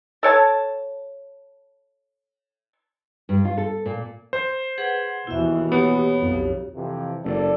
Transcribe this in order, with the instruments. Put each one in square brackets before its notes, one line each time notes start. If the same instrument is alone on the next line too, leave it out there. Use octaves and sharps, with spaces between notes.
[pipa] A4 C#5 A5
[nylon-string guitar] G2
F4
A4
A#2
[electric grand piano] C5
[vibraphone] G#4 B4 F#5
[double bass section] D#2 B2 E3 [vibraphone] E4 E5
[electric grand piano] B3 [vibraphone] G4 C#5
[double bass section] B1 F2
[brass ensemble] F2 C3 E3
[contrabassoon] F#1 [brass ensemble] A4 D5